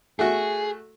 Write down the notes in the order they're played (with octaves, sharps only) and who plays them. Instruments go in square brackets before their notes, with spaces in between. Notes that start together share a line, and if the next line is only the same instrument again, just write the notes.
[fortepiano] A3 F#4 [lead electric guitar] G#4